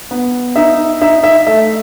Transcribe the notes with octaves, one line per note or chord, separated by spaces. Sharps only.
B3
D#4 E5
D#4 E5
E5
A3 E5